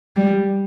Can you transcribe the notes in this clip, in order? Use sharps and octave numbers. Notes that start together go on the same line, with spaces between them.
G3